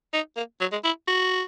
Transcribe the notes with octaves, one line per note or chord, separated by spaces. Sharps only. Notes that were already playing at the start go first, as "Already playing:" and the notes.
D#4
A#3
F#3
G#3
E4
F#4